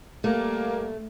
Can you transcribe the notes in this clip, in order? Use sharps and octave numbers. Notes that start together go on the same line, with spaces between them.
G3 A3 A#3